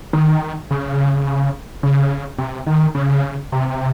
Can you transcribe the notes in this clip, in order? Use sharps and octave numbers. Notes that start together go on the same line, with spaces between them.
D#3
C#3
C#3
C3
D#3
C#3
C3